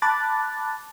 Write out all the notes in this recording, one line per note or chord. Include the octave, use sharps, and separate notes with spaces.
A5 B5 D6 F#6 A6